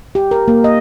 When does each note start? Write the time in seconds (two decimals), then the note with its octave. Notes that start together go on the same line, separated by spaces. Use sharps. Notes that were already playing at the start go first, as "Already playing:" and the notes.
0.15 G4
0.31 A#4
0.48 A#3
0.64 D#5